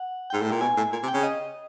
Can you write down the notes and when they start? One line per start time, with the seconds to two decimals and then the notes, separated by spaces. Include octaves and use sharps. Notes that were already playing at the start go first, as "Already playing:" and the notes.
Already playing: F#5
0.30 G#2 G5
0.42 A2
0.51 A#2
0.61 B2 G#5
0.77 A2
0.92 A#2 G#5
1.03 C3
1.08 G5
1.14 C#3
1.23 D#5